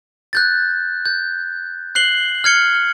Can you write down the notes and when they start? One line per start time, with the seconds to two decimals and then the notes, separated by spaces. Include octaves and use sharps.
0.33 F#6 G6 A6
1.05 G6
1.95 F#6 C7 F#7 G7
2.44 F6 G#6 C#7 G7